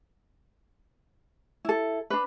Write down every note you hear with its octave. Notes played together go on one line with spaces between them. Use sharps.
E4 A4
D4 B4